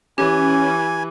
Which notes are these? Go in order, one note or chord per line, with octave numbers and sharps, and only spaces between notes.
E3 C#4 G4 G#5